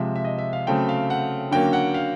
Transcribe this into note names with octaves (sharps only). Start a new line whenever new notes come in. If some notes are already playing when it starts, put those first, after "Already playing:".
Already playing: C3 F3 G#3 E5
E5
D#5
E5
F5
C#3 F#3 A3 C4 G5
F5
F#5
D3 F#3 A#3 C#4 G5
F#5
F5